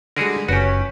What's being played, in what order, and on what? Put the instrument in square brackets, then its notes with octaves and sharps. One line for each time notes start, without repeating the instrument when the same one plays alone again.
[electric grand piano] D3 G3 G#3 [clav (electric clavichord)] F#4 G#4 A#4
[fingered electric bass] F#1 [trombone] C#4 [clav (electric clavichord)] F#4 G4 [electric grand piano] B4